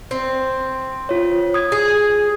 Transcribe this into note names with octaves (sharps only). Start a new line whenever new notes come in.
C4
F4 C#5
D#6 G#6
G#4